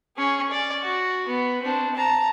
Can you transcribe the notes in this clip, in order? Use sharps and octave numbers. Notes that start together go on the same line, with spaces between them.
C#4 G#4
D5
F#4
B3
C4 D4
A5 A#5